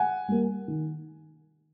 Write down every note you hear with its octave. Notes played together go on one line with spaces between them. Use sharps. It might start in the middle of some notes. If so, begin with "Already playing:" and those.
Already playing: F#5 G#5
G3 A#3
D#3